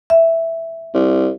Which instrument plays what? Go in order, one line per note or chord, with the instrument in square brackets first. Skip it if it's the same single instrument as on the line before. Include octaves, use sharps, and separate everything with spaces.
[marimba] E5
[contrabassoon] C2